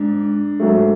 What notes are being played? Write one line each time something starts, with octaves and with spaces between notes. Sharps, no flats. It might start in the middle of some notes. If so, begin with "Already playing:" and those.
Already playing: G#2 D4
G#2 F#3 A3